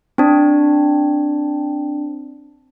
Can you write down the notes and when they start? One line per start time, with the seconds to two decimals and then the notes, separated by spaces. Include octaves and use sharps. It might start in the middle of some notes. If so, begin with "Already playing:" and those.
0.18 C4 D4